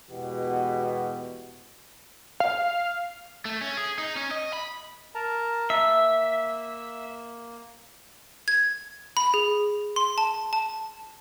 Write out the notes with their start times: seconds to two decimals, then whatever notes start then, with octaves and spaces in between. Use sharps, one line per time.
0.10 E2 B2 G#3 B3 F#4 G4
2.40 F5
3.45 A3
3.62 C#4
3.77 G#4
3.98 D#4
4.16 C#4
4.31 D#5
4.53 B5
5.15 A#4 A5 A#5
5.70 A#3 E5
8.48 G#6
9.17 B5
9.34 G#4
9.96 C6
10.18 A5
10.53 A5